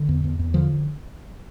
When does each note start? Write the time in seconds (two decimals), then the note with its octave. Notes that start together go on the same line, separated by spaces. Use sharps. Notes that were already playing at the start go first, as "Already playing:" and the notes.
Already playing: D3
0.09 E2
0.24 E2
0.39 E2
0.54 D3 F3